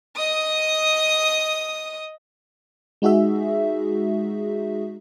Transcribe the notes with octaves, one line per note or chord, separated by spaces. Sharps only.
D#5 D#6
G#3 D#4 F#4 G#4 E5